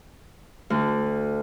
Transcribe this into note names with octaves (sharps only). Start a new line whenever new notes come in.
D2